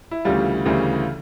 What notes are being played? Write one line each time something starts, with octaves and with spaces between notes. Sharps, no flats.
E4
D2 C#3 E3 G3 F4
D2 C#3 E3 G3